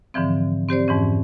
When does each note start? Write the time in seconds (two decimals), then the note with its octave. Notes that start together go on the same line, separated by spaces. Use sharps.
0.14 G#2 D3 E3 F3 C4
0.69 C4 G4 C5 D5
0.88 F2 G#2 E3 C#4